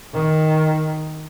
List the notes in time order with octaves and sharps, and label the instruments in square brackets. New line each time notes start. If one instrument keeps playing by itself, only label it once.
[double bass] D#3